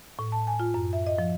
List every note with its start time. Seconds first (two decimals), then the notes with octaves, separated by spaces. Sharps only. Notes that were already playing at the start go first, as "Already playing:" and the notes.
0.19 A2
0.32 A5
0.47 G#5
0.60 F4
0.74 F#2
0.93 E5
1.07 D#5
1.19 F3